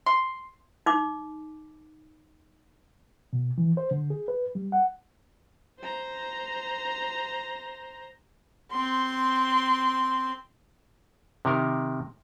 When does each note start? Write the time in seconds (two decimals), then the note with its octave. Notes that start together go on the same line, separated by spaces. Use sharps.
0.06 C6
0.86 D#4 D6
3.33 B2
3.58 E3
3.77 C5
3.91 D3
4.10 G#4
4.28 B4
4.55 G3
4.72 F#5
5.80 C5 A#5
8.72 C4 C6
11.45 C3 D#3 A#4